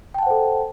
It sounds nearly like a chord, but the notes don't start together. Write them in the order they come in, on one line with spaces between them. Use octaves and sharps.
G5 A5 F#5 C5 A4